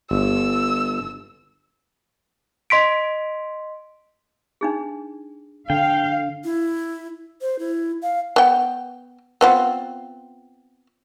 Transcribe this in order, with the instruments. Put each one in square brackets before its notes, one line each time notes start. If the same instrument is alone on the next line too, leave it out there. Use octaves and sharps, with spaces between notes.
[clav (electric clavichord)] G1 [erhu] E6
[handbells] D#5 C6 B6 D7
[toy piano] D4 D#4 G#4
[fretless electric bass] D3 [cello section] F5 [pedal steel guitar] G5
[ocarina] E4
C5
E4
F5
[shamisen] B3 G5
B3 C4 F4